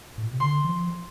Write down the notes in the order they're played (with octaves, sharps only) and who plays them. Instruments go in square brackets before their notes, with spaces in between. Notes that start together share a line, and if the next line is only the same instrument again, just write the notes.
[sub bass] A2
A#2
C3
[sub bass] D3 [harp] C6
[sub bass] E3
F3